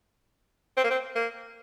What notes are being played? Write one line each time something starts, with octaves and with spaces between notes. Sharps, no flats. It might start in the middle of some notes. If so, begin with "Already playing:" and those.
C4
A#3
C4
A#3